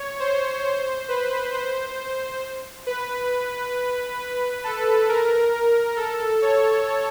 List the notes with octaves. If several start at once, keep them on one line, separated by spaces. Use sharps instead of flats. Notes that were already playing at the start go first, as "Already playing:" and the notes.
Already playing: C#5
C5
C5
B4
C5
B4
B4
A4
A#4
A4
C#5